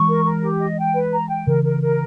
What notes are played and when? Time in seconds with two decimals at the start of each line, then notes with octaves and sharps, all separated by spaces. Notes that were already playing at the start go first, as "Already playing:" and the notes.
Already playing: E3 G#3 C#6
0.08 A#4
0.25 A#4
0.43 G4
0.60 D#5
0.78 G5
0.95 B4
1.12 A#5
1.30 G5
1.47 C#3 E3 A#4
1.64 A#4
1.82 A#4